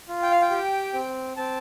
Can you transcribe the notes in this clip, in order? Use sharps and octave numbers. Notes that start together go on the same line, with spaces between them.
F4
G5
F5
G5
G4
C4
C4 A5